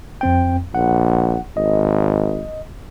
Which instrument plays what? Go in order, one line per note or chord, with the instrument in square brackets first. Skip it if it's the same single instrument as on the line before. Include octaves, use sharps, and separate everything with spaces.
[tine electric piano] F2 C4 G5
[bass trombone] A#1 [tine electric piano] F#5
[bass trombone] G#1 [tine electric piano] D#5